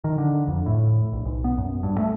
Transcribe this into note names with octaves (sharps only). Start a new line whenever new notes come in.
D#3
D3
F2
A2
A#1
B1
B3
F#2
G2
A3